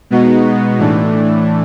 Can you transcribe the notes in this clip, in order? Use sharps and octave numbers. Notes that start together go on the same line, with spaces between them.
B2 G#3 B3 D#4 F#4
A2 E3 A3 D4